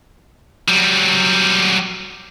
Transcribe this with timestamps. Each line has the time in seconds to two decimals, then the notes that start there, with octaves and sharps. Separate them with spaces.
0.68 F#3 G3